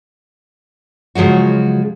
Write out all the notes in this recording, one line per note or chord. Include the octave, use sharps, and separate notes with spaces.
C#3 F3 F#3 G#3 F#4